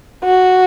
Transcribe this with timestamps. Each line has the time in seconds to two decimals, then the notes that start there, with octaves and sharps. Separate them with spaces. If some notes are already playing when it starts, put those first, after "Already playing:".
0.25 F#4